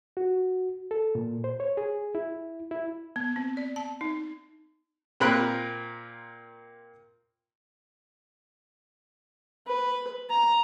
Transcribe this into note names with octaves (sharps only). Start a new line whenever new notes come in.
F#4
A4
A#2
C5
C#5
G#4
E4
E4
B3
C4
D5
A5
D#4
A#2 C4 F4 A#4 B5 F#6
B4
A#5